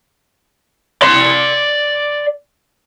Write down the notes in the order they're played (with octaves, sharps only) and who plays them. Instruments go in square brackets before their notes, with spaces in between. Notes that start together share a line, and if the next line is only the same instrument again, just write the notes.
[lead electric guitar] D5 C6